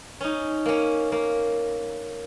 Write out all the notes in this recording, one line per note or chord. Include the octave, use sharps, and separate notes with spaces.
C#4 D#4
A#3 C#4
A#3